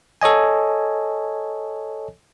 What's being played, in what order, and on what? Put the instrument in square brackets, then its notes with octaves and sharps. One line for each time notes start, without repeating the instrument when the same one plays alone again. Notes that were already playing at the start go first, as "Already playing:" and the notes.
[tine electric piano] A4 C#5 D#5 G#5